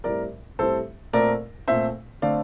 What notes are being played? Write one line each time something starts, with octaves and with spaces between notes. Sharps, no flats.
A2 G3 C4 A#4 D5
A2 G3 C4 A4 C5
A#2 A3 C4 A#4 D5
A#2 A3 C4 C5 E5
D3 A3 C4 D5 F5